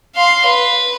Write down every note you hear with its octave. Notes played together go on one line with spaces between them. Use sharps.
F5 C6
B4